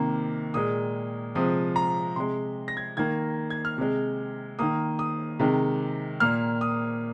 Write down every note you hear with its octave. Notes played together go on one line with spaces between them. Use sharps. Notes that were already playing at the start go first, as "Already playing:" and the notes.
Already playing: C3 D#3 A#3
A#2 G#3 D#6
C3 F3 G#3 D#6
A#5
C3 G#3 C6
A#6
G#6
D#3 A#3 G#6
G#6
F6
C3 G#3
D#3 A#3 D#6
D#6
C3 D#3 G#3
A#2 A#3 F6
D#6